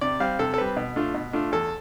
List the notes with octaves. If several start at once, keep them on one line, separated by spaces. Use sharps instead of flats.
C3 D5
G3 C4 F5
C3 A4
A4
G3 C4 B4
B2
A3 D4 F4
B2
A3 D4 F4
E2 A4